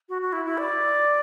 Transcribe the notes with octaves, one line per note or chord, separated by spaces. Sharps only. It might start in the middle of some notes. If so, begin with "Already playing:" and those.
F#4
F#4
E4
E4
D5